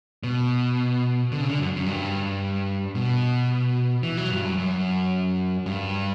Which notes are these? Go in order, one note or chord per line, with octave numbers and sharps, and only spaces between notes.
B2
D3
C#3
D3
F#2
F#2
G2
B2
E3
F#3
G2
F#2
F#2
G2